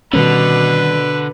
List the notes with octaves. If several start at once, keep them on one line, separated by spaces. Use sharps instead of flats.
B2 D3 D#3 G3 C#4 B4